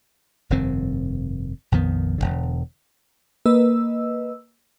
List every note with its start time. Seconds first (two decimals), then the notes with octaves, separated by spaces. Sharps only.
0.50 F1 G2 D#3 C4
1.72 A#1 F2 D#3 B3
2.18 E1 B1 D3
3.46 A#3 B4 D#5 E6